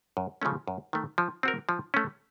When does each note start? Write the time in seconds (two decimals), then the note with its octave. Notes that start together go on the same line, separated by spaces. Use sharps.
0.17 F#2
0.42 C#3 F3 A3 C#4
0.68 F#2
0.93 D#3 A3
1.18 F3
1.43 C4 F#4 A#4
1.69 F3
1.94 A3 C#4